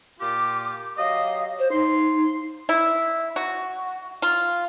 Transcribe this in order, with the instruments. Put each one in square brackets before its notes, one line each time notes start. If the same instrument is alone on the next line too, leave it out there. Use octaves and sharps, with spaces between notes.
[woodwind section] A#2 F4 G4 [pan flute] D6
[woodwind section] F#3 G4 D#5 [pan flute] F5
[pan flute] C5
[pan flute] D#4 [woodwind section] C6
[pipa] E4
F#4
F4